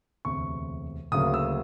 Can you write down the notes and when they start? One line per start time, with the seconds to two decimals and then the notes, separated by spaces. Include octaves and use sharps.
0.25 E1 D2 C3 C#6
1.12 D2 C#3 F#3 A#3 D#6
1.34 E6